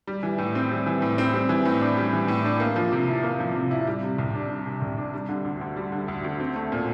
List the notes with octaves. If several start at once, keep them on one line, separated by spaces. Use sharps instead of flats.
G3
E3
A2
C4
G3
E3
A2
C4
G3
E3
A2
D4
G3
E3
A2
D4
A#3
F3
C3
E4
A#3
F3
C3
E4
G3
C3
C2
D4
G3
C3
C2
D4
G3
D3
D2
D2
G3
D3
D2
D2
C4
A3
A#2